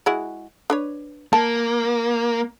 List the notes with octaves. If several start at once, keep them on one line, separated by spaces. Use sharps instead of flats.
G#3 E4 F#4
D4 B4 C#5
A#3 A5